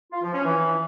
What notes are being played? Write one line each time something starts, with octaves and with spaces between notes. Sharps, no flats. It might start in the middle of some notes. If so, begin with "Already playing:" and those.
F4
F3
C#4
E3